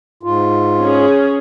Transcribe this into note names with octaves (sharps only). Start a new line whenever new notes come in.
G#2 F4
C#4 G#4